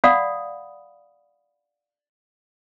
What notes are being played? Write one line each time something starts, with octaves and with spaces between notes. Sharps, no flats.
D5 F5 F#5 B5 D#6